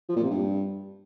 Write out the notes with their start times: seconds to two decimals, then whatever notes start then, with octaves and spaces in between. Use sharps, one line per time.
0.09 F3
0.16 A#2
0.23 C3
0.30 G2